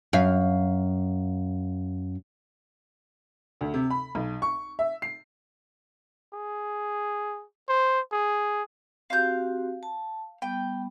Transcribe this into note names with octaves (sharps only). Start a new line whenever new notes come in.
F#2 F5
D2
C3
B5
B1
C#6
E5
C7
G#4
C5
G#4
C4 F#4 G4 F5 G6
A5
G3 B3 G5